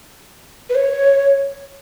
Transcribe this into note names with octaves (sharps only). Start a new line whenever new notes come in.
B4
C#5